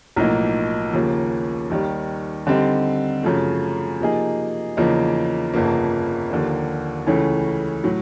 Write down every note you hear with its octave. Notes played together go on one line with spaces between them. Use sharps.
B1 A2 F3 A#3 D#4
D#2 C#3 F3 A#3
D#2 D#3 G3
D3 G3 C4 D#4
F#2 C#3 F3 A3
C3 F3 A#3 D#4 G#4
E2 C#3 F3 A#3 D#4
G1 F2 C#3 F3 A#3
D#2 D3 F3 A#3
C#2 C#3 E3 A3 C#4
A2 F#3